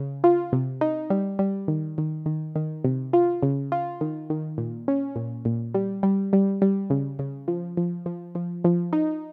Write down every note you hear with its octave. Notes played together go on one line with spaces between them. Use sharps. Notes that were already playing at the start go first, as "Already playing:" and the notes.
Already playing: C#3
F4
C3
D#4
G3
G3
D#3
D#3
D#3
D#3
C3
F4
C#3
F4
D#3
D#3
A#2
C#4
A#2
A#2
G3
G3
G3
G3
C#3
C#3
F3
F3
F3
F3
F3
D#4